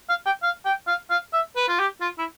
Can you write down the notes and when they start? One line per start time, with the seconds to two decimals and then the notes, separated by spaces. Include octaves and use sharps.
0.09 F5
0.26 G5
0.43 F5
0.66 G5
0.88 F5
1.10 F5
1.33 E5
1.56 B4
1.68 F4
1.79 G4
2.01 F4
2.18 E4